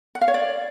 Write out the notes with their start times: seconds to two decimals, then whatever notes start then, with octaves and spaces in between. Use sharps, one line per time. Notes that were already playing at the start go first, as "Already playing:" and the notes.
0.15 F#5
0.21 F5
0.28 C#5
0.34 D5